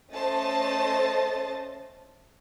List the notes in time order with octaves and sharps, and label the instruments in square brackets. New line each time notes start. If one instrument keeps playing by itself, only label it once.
[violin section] A3 C#4 C5 D#5 A5 A6